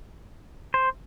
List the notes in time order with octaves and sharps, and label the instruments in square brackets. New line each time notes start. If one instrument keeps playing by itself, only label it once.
[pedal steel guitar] C5